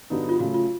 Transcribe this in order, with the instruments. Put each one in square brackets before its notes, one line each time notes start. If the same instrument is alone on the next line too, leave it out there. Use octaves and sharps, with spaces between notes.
[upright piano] G2 D3 F#3 B3 D#4
[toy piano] F4
[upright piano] C#3 F#3 A3 [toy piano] F#4
[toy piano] F4